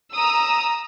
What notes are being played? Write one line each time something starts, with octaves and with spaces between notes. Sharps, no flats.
A#5 D#6 E6